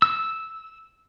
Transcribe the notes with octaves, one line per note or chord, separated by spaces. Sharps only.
E6